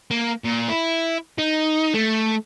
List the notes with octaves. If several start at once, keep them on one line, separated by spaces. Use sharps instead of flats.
A#3
A#2
E4
D#4
A3